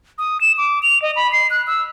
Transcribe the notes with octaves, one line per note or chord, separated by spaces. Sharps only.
D#6
E7
D6
F7
D#5
B5
C7
F#6
E6